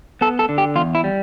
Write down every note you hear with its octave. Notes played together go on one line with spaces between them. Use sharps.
B3 A4
A4
D3
G4
E2 F4
E4
G3